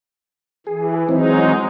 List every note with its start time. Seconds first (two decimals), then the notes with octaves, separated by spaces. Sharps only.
0.67 E3 G#4
1.09 E3 F#3 G#3 C4 D#4